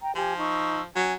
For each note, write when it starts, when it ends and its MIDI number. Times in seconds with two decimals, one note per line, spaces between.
0.01 0.14 79
0.01 0.14 82
0.15 0.83 53
0.15 0.37 67
0.15 0.37 80
0.38 0.81 63
0.38 0.81 85
0.38 0.81 88
0.96 1.14 54
0.96 1.13 61
0.96 1.13 80